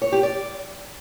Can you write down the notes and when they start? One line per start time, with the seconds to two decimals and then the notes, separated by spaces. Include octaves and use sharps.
0.02 C#5
0.12 G4
0.23 D5